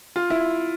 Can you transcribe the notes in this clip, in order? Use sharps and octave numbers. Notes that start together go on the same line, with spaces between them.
F4
E4